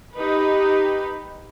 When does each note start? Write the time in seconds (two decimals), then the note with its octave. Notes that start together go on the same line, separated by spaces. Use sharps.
0.14 D#4 G4 B4